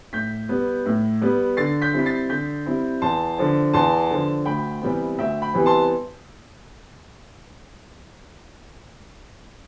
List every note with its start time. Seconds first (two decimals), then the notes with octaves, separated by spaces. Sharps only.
0.13 A2 G6 B6
0.49 G3 B3
0.86 A2
1.21 G3 B3
1.57 D3 A6 C7
1.82 G6 B6
1.93 G3 C4 E4
1.99 B6
2.06 A6 C7
2.29 D3 G6 B6
2.66 G3 C4 E4
3.02 E2 A5 C6
3.38 D3 F3
3.73 E2 A5 C6
4.11 D3 F3
4.46 D2 G5 B5
4.82 C3 E3 G3 B3
5.18 D2 E5 G5
5.42 G5 B5
5.54 C3 E3 G3 B3
5.66 A5 C6